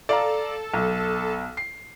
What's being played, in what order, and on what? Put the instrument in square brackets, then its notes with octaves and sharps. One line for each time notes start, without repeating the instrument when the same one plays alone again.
[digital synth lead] A4 [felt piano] D5 F5 A#5
[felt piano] B1
C7